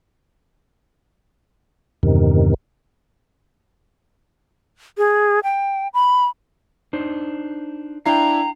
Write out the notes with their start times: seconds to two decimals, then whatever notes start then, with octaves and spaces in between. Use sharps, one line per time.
2.03 E2 G2 C3 D#3
4.98 G#4
5.44 G5
5.94 B5
6.93 D4 D#4 C5
8.06 D4 E4 F5 G5 A#5 C7